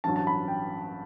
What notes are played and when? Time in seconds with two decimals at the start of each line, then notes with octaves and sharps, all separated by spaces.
0.04 A1 G2 F#3 A5
0.16 A5
0.27 B5
0.48 G5